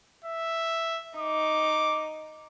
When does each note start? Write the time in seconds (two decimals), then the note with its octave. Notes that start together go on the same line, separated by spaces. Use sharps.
0.25 E5
1.18 D#4 D6